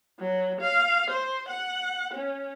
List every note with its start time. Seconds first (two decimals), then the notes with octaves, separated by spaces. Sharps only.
0.20 F#3
0.60 F5
1.10 C5
1.48 F#5
2.13 C#4